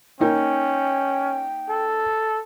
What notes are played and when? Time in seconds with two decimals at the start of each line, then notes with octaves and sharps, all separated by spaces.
0.20 A#3 C#4 D#4 G5
1.69 A4